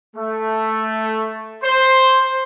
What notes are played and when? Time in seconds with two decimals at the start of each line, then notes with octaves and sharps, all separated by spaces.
0.16 A3
1.63 C5